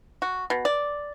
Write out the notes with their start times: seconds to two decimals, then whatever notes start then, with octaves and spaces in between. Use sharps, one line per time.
0.22 F#4
0.50 B2
0.65 D5